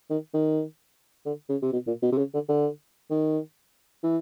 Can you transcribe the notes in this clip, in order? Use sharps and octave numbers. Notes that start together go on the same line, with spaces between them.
D#3
D#3
D3
C#3
C3
B2
A#2
B2
C3
C#3
D3
D3
D#3
E3